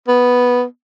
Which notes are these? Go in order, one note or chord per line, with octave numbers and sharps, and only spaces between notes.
B3